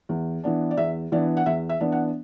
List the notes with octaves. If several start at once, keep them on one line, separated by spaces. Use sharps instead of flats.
E2
E3 B3 D4
D5
E2 E5
E3 B3 D4 D5
F#5
E2 E5
E5
E3 B3 D4
F#5